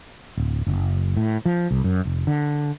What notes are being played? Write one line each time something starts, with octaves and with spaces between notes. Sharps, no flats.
D1
F#1
A2
F3
C2
F#2
F1
D3